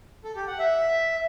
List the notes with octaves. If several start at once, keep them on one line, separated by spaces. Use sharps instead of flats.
A4
G4
F#5
E5